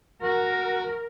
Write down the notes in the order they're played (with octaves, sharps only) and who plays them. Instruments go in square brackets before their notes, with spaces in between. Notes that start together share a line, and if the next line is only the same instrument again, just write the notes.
[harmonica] F#4 [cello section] A#4